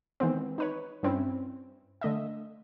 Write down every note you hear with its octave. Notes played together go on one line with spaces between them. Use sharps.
D#3 E3 G#3 B3 C4
D#4 B4 C#5
G2 C4 C#4 E4
D3 A3 D#5 E5